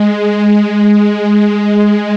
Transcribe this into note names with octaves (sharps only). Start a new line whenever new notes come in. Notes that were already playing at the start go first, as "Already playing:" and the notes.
Already playing: G#3
G#3